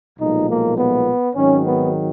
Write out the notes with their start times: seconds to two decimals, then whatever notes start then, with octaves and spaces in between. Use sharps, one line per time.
0.19 B1 A#2 F3 G#3 D#4
0.48 A#3
0.77 B3
1.34 G#1 G#2 D#3 F#3 C#4
1.64 B3